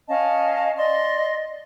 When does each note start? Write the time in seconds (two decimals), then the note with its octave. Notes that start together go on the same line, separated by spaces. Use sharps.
0.08 C#4 D#5 F5 A5
0.76 D5 D#5 C6